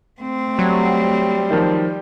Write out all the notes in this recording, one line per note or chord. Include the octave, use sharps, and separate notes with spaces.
A3 C4
F#3 G3
D#3 F3